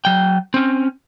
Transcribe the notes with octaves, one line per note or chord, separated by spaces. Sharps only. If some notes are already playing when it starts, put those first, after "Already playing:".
F#3 G5
C4 C#4